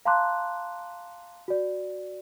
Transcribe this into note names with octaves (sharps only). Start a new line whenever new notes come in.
F5 A5 A#5 C6 D6 F#6
F#4 D5